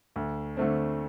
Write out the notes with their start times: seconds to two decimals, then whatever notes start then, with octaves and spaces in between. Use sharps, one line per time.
0.16 D2
0.57 D3 A3 C4